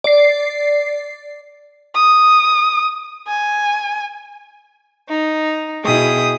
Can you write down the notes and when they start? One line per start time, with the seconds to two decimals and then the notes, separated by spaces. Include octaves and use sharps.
0.04 D5 C7
1.95 D#6
3.28 G#5
5.08 D#4
5.83 B2 E4 G#4 G5 D#6